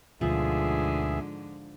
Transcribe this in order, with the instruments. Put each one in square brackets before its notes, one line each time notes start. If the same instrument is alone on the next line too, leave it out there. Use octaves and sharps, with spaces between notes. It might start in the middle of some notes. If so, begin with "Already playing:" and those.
[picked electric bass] D2 B2 [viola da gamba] G#2 D3 [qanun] F3 [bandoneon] B3 G#4 E5